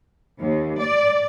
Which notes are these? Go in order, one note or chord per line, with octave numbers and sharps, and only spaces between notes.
D#2
D5